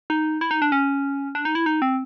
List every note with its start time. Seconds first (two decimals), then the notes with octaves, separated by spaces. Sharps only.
0.10 D#4
0.41 E4
0.51 D#4
0.62 D4
0.72 C#4
1.35 D4
1.45 D#4
1.55 E4
1.66 D#4
1.82 C4